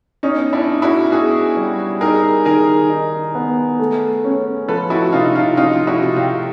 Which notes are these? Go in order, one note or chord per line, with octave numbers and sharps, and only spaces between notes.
B3 C#4 D#4
D4 E4
D#4
E4 F#4
B3 F#4 G#4
G3
D#4 G#4 A#4
D#3 G#4 A#4
D#4
B3
A3
C#4
F3 A4 B4
E4 F#4
C3 D#4 F4
D#4 F4
F3 D#4 F4
E4 F#4
C3
F4 G4